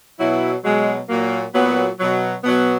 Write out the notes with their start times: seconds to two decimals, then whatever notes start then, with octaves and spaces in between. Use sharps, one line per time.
0.19 B2 F#3 E4
0.64 B2 F#3 G#3
1.09 A#2 F#3 A#3
1.54 A#2 F#3 B3
1.99 B2 F#3
2.44 B2 F#3 B3